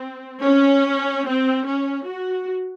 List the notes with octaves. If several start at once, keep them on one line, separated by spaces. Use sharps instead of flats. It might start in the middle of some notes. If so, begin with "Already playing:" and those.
Already playing: C4
C#4
C4
C#4
F#4